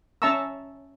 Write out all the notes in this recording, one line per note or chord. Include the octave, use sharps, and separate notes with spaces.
C#4 E5 A5 A#5 C#6 E6